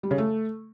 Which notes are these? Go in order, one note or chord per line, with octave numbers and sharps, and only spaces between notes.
G3
C#3
A3